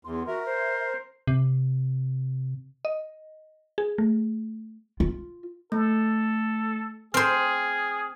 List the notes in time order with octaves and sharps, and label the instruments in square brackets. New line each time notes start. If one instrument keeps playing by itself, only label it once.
[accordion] E2 [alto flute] C6
[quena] F#4 [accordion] A#4 [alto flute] E5
[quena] C5
[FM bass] C3
[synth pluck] D#5
G#4
A3
[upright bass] F4
[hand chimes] A3 [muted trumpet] A4
[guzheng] C4 C5 [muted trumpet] G#4 [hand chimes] F6